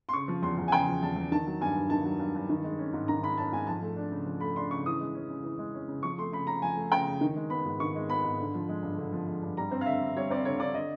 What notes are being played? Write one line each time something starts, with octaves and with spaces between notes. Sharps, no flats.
C6
C#3 C#6
F3
E2 C6
E2
G#5
C#3 G5
F3
E2 A5
E2
D#3 A5
F#3
G2 G#5
G2
D#3 A5
F#3
G2
G2
D#3
G#3
C#4
G#2
D#3 A#5
G#3 B5
C#4 A5
G#2 G#5
F3 A5
A3
D4
C#3
F3
A3 B5
D4 C6
C#3 C#6
E3 D#6
G#3
C#4
C#3
E3
G#3
C#4
C#3
F3 C#6
A3 C6
C#3 B5
C#3 A#5
F3 G#5
A3
C#3 G5
C#3
D#3
G#3
B3 B5
G#2
D#3 C#6
G#3
B3 B5
G#2
D3
F3
G#3
G2
D3
F3
G#3
G2
G3 A#5
C4
F5
D3 E5
D3
G3 C#5
C4 D5
D3 C#5
D3 D5
D3 D#5